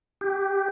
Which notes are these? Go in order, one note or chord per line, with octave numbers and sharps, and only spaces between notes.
G4